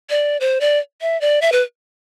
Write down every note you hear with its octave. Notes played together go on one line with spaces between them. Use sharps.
D5
C5
D5
E5
D5
E5
B4